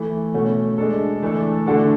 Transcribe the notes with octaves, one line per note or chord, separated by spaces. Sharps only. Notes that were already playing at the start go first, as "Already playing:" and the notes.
Already playing: E3 A3 E4
B2 A3 C#4 F#4
G#3 D4 A4
E3 A3 D4 A4
D3 A3 D4 F#4 A4